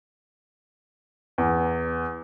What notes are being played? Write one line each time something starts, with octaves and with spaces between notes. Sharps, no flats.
E2